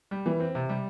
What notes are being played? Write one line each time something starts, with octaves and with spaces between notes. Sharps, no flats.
G3
E3
C4
C3
G3